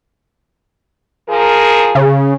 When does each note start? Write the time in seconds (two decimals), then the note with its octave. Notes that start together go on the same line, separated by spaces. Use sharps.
1.29 F3 G#4 A#4
1.95 C#3